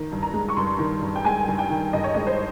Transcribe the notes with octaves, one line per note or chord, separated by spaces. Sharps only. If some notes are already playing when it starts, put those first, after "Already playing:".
Already playing: D#3
G2
A#5
G#3
C#6
G2 C6
D#3
G2
G5
G#3 G#5
G2
G5
D#3
G2 D#5
C#5
G#3 D#5
C5